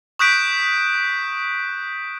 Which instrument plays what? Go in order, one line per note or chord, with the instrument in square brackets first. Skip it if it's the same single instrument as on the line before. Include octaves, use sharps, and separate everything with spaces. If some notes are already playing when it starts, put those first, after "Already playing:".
[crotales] C#6 D#6 F#6 G6 B6 D7